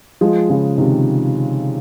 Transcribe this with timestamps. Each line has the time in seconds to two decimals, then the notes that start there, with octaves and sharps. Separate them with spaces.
0.21 F3 G#3
0.49 C#3 F3
0.78 C3 D#3